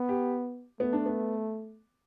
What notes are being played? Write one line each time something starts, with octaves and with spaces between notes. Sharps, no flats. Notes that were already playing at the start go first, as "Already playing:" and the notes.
Already playing: B3
G4
A3 B3
D4
B3